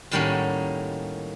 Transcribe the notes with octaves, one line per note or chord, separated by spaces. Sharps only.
A2 D#3 G3 A#3 C#4 F#4